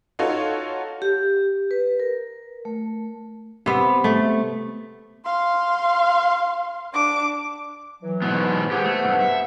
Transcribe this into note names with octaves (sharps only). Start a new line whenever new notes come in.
D#4 F4 F#4 A4 C#5
G4
B4
A#4
A3
C3 B3
A3
F5 C6
D4 D6
E3 F#3
G#2 B2 B3
B3 G4 G#4 C5 F#5
A3
G2 B2
E5